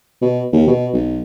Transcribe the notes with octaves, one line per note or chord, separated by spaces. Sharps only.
B2
D#2
B2
B1